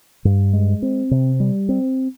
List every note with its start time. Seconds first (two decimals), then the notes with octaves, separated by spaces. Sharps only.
0.25 G2
0.53 G#3
0.82 C4
1.11 C3
1.40 G3
1.69 C4